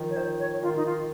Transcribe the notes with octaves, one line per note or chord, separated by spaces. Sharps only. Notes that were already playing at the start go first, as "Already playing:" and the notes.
Already playing: D#3 F3
C#5
D#3 C5
C#5
D#3 F4
D#4
F4